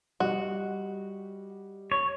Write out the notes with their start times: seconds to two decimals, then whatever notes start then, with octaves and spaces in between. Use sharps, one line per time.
0.20 G3 F#4 G4 D#5
1.92 C#5